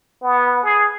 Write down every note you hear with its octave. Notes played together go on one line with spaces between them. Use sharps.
B3
G#4